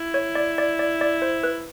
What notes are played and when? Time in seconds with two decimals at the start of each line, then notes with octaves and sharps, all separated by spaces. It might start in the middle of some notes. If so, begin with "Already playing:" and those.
Already playing: E4
0.14 C#5
0.35 D5
0.58 D5
0.79 D5
1.01 D5
1.22 C5
1.43 B4